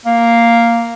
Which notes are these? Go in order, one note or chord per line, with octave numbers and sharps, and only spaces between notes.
A#3